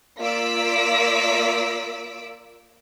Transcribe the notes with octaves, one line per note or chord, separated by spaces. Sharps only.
A#3 F4 D5 E6 B6 D7